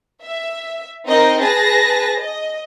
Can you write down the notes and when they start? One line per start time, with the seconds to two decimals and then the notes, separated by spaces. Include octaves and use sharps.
0.23 E5
1.07 C4 D#4 A#4 D#5
1.40 G#4 B4 A5 A#6
2.19 D#5